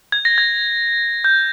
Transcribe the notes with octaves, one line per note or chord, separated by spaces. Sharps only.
G#6
A#6
G#6
G6